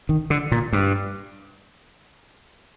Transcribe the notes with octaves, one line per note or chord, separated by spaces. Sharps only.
D#3
D3
A#2
G2